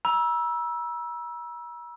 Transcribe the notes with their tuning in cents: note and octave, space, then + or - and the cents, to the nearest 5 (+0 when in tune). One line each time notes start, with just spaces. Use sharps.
A#5 +45 E6 +0